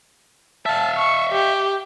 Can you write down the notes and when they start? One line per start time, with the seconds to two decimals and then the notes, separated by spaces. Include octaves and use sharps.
0.66 E5 F5 A5
0.97 C#6
1.33 G4